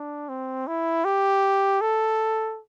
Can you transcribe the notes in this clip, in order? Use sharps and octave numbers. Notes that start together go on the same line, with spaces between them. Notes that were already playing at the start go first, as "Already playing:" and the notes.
Already playing: D4
C4
E4
G4
A4